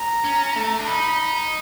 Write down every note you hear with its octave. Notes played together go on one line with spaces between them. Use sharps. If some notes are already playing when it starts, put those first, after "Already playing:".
Already playing: A#5
C#4
A3
D4
D#4 B5